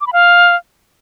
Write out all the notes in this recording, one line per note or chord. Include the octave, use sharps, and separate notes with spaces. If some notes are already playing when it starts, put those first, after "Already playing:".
D6
B5
F5